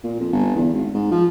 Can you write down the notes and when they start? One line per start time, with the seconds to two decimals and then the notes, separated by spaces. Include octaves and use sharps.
0.04 A#2
0.20 F2
0.32 G1
0.55 E2
0.73 G#1
0.94 G#2
1.11 F3